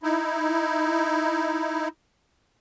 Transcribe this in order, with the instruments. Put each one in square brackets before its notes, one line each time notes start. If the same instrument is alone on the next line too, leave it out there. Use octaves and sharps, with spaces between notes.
[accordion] D#4 E4